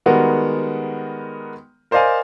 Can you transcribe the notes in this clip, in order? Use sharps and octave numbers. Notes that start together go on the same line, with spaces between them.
D#3 G3 G#3 B3 F#4 A#4
A#4 C5 D5 D#5 F5 G#5